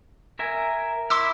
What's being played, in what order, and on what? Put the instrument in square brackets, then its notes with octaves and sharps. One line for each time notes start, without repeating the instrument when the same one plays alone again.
[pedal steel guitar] A#4 E5 G#5
[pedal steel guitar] E4 [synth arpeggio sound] C6 D6 E6